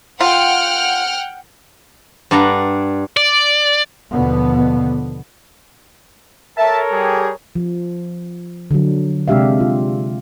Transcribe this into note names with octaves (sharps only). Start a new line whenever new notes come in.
F4 F#5 G5 F6
G2 D4 F#5 A#5
D5
D#2 B2 D3 F3 B3
A4 A#4 C#5 E5 A5
G3 G4 G#4
F3
D3 F#3
C3 G#3 D4 G4 E5 F5
F4